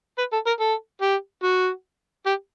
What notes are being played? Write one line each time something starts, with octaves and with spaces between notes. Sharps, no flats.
B4
A4
A#4
A4
G4
F#4
G4